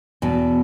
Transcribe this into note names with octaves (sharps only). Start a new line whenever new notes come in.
E2 B2